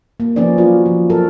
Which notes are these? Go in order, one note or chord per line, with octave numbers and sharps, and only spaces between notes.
A#3
F3 B3 C#4 D#4 D5
F#3 F4 F#4
F3
F#3 F#4 A4 A#4